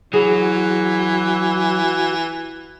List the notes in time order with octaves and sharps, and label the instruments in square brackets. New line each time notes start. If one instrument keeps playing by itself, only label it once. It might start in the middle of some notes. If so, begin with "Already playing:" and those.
[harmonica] E3 [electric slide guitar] F#3 [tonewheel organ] F#4 [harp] G#4